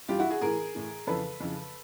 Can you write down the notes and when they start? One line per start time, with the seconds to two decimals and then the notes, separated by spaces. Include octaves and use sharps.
0.08 G2 E3 F4 G4
0.19 E4 F#4
0.30 F#4 G#4
0.41 A2 E3 G#4 A#4
0.75 A2 E3
1.07 F2 C#3 E3 A4 B4
1.40 F2 C#3 E3